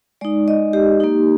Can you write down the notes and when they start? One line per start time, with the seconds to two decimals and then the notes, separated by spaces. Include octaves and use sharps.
0.21 G#3 D#4 D5
0.48 D#5
0.73 G4
1.00 A#3 D#4